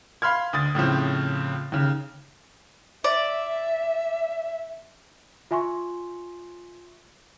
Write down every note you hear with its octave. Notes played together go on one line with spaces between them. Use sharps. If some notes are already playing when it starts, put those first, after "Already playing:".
F5 B5 C6 F6 G#6
D2 D#6 A6
A2 C#3 F3 C4
D#2 C#3
D5 E5
F4 E5 G#5 C6 C#6